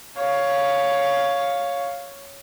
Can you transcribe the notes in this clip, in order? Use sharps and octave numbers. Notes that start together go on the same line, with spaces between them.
C#5 F5